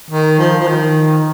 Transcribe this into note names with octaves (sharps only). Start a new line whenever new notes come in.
D#3
F3
F3
D#3